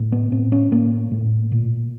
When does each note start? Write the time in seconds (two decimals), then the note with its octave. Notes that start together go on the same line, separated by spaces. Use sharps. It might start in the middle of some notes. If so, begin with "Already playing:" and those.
Already playing: A2
0.12 B3
0.32 A2 C4
0.52 C#4
0.72 A2 A#3
1.11 A2
1.52 A#2